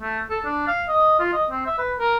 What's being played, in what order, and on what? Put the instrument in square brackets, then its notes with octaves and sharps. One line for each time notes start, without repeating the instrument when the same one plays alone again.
[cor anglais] A3
A4
D4
F5
D#5
F4
D#5
C4
E5
B4
A#4